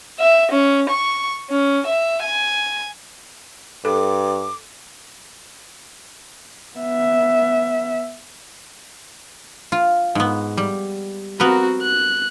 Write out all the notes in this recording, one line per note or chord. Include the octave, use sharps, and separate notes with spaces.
E5
C#4
C#6
C#4
E5
G#5
G2 A4 D6
B3 E5
F4
G#2 B3
G3
B3 C4 F#4 A#4 B4
F#6